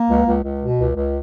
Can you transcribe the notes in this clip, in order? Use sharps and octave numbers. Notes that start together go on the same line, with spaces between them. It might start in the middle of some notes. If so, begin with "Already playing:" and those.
Already playing: A#3
C#2
C#2
C#2
B2
C#2
C#2